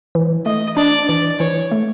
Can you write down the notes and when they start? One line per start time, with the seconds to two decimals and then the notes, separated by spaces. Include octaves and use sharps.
0.15 E3
0.46 A3 D#5
0.77 D4 D5
1.09 E3 D5
1.40 E3 C#5
1.72 A3